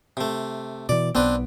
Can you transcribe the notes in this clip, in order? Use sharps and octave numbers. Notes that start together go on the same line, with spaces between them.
C3 A3
B2 E3 D5
B1 B3 C4 D4 B4